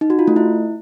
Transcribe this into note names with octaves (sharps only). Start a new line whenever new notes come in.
D#4
F#4
F4
A3
E4